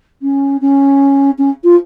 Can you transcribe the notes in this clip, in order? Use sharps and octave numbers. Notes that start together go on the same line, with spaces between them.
C#4
C#4
C#4
F4